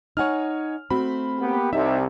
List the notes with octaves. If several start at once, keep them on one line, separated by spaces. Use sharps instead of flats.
D#4 C#5 F#5 G#5 F6
A3 C4 F#4 B5
A#3 B3 G4
C2 C3 D#4 E5